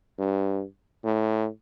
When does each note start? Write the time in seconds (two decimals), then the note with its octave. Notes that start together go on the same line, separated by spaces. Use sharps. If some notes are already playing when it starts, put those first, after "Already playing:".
0.19 G2
1.04 A2